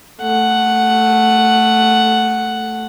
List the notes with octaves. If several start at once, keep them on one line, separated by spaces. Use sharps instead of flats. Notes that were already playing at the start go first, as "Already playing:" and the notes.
A3 F#5